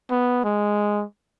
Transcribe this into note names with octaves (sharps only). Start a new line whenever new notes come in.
B3
G#3